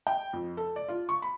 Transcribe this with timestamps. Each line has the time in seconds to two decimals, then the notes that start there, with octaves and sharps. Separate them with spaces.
0.07 G5
0.33 F2
0.57 A4
0.76 D5
0.88 F4
1.09 C#6
1.22 B5